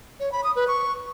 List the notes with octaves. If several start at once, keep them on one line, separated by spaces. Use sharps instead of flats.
C#5
B5
D#6
B4
C#6